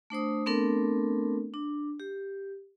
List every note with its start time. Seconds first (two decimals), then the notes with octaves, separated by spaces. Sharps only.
0.10 A3 D4 C5 D#6
0.46 A3 B3 C4 D4 A4 A#4
1.54 D4
2.00 G4